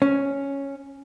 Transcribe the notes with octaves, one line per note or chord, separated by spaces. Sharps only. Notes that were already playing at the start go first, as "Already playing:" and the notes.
C#4